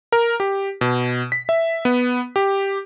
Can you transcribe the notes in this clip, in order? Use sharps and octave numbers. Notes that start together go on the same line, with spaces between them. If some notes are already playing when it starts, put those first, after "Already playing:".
A#4
G4
B2
B6
E5
B3
G4